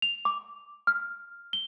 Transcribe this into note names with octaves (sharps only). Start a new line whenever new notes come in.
F7
D6
F6
G7